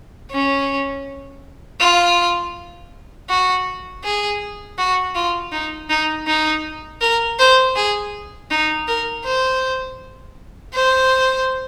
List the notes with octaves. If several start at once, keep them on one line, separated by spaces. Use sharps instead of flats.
C#4
F4
F#4
G#4
F#4
F4
D#4
D#4
D#4
A#4
C5
G#4
D#4
A#4
C5
C5